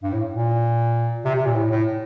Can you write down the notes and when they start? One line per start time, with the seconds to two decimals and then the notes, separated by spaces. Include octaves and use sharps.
0.03 G2
0.13 A2
0.34 A#2
1.25 C3
1.35 C3
1.45 A#2
1.55 A2
1.71 A2